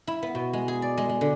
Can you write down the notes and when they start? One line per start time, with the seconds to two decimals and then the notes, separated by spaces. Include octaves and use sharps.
0.07 E4
0.23 B3
0.35 B2
0.53 G#3
0.68 G#4
0.82 D5
0.98 G#3
1.09 G#3
1.21 D3